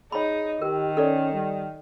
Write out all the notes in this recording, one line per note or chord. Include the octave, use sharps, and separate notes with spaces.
D#4 G#4 C#5 B5
D#3 G4 A#4
C#4 A4 D5
G3